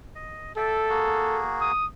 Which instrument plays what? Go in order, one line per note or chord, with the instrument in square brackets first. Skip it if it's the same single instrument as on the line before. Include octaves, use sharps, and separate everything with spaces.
[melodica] D#5
[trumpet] A4 [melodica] D5 E5 G5
[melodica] A#3 F#4 G#4
[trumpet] D#6